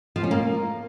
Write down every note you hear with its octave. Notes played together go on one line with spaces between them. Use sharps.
F3
C#4
A#3